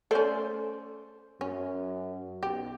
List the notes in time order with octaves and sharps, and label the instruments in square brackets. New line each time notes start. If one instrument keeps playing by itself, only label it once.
[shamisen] A3 C#4 [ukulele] A4 C5 D5
[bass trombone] F#2 [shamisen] C#4
[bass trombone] B1 [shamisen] G4